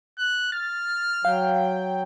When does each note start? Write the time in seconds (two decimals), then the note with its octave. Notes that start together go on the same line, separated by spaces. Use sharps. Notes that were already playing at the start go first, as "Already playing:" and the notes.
0.18 F#6
0.52 F6 A6
1.25 F#3 F5 G5